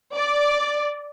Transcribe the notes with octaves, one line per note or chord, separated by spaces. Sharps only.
D5